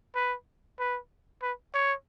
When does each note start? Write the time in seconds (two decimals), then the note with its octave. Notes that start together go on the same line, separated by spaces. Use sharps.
0.15 B4
0.79 B4
1.42 B4
1.74 C#5